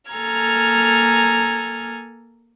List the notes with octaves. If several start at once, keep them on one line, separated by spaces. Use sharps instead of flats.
A#3 A4 G#5 A#5 F6 G#6